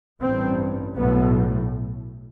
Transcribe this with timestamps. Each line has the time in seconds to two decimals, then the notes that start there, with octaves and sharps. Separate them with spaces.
0.21 A1 G2 C4
0.96 B1 A2 B3